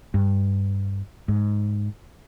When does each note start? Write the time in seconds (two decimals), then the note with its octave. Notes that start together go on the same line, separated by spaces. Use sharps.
0.14 G2
1.28 G#2